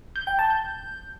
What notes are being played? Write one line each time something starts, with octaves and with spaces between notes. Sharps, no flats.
G6
G5
A5
G6